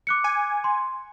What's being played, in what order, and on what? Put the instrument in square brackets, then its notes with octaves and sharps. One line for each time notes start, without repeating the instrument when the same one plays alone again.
[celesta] D6 F#6 C#7
[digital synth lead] G#5
[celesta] C6